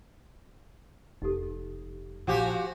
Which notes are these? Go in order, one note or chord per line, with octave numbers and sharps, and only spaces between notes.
F1 D#4 G4 A4
A#1 F3 F#4 G4 F#5 G#5